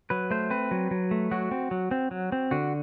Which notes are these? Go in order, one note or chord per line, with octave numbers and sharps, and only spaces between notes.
F#3 B4
A3 C5
C4 B4
F#3
F#3
A3
F#3 F#4
C4
F#3
C4
F#3
C4
D3 F#4